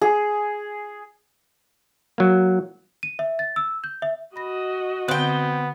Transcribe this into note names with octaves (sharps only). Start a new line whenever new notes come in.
G#4
F#3 A#3
D#7
E5
A6
E6
G6
E5
F#4 D#5 B5 A#6
D3 B3 C4 G5